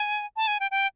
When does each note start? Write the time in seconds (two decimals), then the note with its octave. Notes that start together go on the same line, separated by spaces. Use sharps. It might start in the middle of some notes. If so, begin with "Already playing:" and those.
Already playing: G#5
0.36 A5
0.47 G#5
0.60 G5
0.71 G5